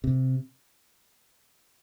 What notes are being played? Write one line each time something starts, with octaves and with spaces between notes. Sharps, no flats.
C3